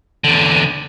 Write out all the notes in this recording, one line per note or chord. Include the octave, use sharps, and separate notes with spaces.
E2 D3